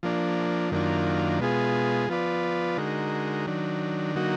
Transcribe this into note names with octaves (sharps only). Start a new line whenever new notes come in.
F3 A#3 D4
F#2 D#3 A#3 D4 F4
B2 G#3 B3 F4 G#4
F3 B3 F4 B4 D5
D3 G#3 D#4 F#4 A#4
D#3 F#3 D4
D3 F#3 A#3 D#4 F#4